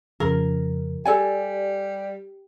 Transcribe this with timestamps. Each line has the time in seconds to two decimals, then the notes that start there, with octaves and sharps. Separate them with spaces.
0.20 F2 C#3 F3 A#4
1.05 G3 G4 A4 D5 G#5